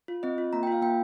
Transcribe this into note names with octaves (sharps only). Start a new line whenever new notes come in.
F4
C4 D#5
F4
A#3 A#5
F4 G5
F5
A#3 G5